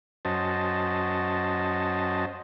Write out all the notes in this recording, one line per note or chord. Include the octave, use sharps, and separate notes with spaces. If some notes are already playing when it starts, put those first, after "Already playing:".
F#2 C#4 F#4 C5 D#5 A5